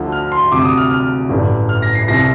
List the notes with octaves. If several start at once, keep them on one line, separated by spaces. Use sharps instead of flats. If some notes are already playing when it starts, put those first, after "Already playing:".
Already playing: D2 D3 F3
F6
C6
D2 C3 F3 D6
D#6
F6
F6
A1 G2 D3
F6
A#6
C7
C2 C3 F3 A#6